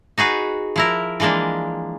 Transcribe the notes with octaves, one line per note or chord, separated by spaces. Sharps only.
D#4 F#4 G#4 B4
F3 E4 A#4
E3 F3 G#3 A#3 D4